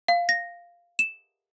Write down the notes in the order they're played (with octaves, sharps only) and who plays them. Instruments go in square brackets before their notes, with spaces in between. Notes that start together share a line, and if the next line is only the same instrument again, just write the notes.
[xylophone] F5
A#6
E7